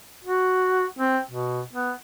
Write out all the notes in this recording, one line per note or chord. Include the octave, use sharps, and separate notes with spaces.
F#4
C4
B2
B3